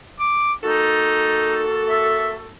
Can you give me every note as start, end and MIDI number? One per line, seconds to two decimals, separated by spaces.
0.19 0.53 86
0.64 2.58 58
0.64 1.64 63
0.64 2.58 66
0.64 2.58 69
1.89 2.33 76